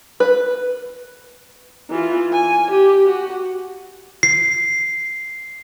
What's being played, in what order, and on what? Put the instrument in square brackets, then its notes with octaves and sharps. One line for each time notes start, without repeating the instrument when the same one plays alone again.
[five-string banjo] B4
[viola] E3 F4
G#5
G4
F#4
[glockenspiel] C7